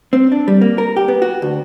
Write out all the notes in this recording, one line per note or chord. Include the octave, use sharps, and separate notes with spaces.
C4
D4
G3
A#3
A#4
G4
B3
F#4
D2